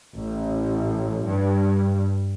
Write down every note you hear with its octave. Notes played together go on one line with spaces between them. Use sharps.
A1
G2